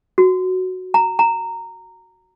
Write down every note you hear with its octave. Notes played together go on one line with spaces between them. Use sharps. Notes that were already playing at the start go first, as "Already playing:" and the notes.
F#4
A#5
A#5